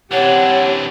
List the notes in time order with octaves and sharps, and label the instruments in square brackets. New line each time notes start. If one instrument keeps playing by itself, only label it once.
[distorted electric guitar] E3 D4 [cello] C4 G4 [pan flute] C#5 [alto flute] F#5